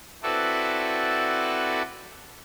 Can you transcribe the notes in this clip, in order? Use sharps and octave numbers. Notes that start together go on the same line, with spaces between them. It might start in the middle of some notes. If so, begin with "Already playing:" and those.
C4 E4 F#4 A4 B4 D5